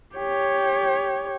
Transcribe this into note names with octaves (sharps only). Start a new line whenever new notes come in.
G4 C#5